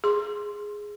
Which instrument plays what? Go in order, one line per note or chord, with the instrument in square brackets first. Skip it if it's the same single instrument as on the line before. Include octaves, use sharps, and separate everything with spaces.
[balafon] G#4 C6